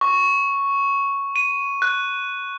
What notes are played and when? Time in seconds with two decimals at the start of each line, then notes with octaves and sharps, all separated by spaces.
0.01 C#6
1.36 D#7
1.82 F#6